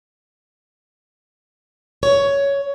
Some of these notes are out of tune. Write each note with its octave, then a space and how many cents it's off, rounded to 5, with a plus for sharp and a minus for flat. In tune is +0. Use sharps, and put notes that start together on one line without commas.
C#5 +10